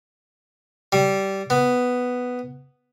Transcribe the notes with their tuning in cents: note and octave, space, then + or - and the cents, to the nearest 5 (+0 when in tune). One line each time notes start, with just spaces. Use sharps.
G3 -15
B3 +5